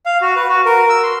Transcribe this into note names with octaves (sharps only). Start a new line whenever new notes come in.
F5
F#4
B4
F#4
A#4
E6
C6